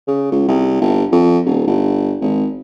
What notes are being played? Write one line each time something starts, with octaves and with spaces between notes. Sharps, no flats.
C#3
C#2
C2
G1
F2
D#1
G1
G#1